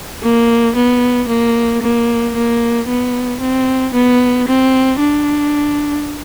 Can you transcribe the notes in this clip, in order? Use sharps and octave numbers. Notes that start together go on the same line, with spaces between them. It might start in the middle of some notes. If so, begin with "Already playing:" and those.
A#3
B3
A#3
A#3
A#3
B3
C4
B3
C4
D4